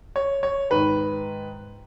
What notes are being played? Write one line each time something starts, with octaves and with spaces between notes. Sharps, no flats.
C#5
C#5
G#2 D#3 B4